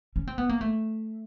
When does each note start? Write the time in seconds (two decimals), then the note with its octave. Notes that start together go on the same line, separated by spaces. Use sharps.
0.16 C#4
0.27 C4
0.38 B3
0.49 A#3
0.61 A3